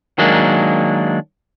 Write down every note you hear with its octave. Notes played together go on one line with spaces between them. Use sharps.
D#3 F#3 G#3 A#3 D4